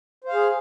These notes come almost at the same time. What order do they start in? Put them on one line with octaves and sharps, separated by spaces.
C5 F5 G#4